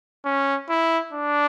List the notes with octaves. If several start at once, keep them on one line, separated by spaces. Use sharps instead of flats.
C#4
E4
D4